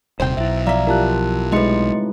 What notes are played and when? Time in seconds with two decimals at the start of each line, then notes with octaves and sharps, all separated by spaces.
0.20 D#1 C3 C5 G5
0.37 B1 E4 E5
0.67 F3 D5 E5 F5 A#5
0.87 E4 F4 G4 A#4 A5 F#6
1.52 C2 A2 G#3 D#4 B4 D#5 C6 C#7